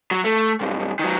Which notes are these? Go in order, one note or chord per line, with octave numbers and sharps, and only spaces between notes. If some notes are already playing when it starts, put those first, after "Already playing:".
F#3
A3
B1 G2
D#3 F#3